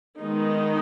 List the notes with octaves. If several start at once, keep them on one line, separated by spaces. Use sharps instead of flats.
D#3 G#3 B3 D#4